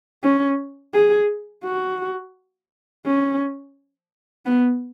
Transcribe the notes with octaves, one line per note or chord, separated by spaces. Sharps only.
C#4
G#4
F#4
C#4
B3